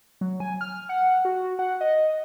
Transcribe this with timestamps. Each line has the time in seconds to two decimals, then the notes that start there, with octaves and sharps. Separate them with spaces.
0.21 F#3
0.40 G#5
0.61 F6
0.89 F#5
1.25 F#4
1.59 F#5
1.81 D#5